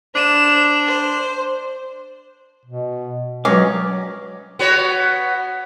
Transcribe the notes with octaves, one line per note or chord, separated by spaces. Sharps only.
D4 C5 E7
C5
B2
F#3 G#3 C#4 F4 B4 D5 D#5 D6
B3 F#4 C#5